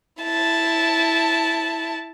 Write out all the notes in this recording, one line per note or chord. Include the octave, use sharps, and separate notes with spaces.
E4 A5